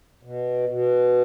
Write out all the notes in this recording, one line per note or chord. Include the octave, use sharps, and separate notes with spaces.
B2
B2